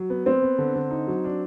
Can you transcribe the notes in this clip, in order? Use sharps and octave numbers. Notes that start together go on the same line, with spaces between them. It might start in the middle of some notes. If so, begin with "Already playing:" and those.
Already playing: F#3
B3
B3 C4
B3
D3
D3
D#4
F#3
D4